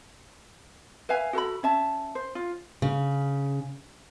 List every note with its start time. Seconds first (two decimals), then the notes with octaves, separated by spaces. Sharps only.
1.09 B4 E5 F5 G#5
1.33 F#4 A4 A#5 B5
1.63 C#4 E5 A5
2.15 C5
2.35 F4
2.82 C#3